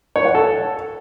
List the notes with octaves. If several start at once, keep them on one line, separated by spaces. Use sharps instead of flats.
C#5
F#5
A4